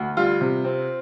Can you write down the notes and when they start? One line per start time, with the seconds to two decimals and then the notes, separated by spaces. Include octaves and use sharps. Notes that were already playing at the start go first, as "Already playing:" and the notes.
Already playing: D2
0.17 G3 F4
0.41 C3
0.64 C4